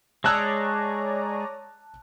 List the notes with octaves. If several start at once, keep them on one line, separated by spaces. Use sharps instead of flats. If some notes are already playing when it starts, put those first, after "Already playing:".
G#3 G#4 C#5 D5 A5 A#5 E6 F#6